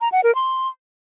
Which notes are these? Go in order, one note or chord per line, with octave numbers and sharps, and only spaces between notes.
A#5
F#5
A#4
C6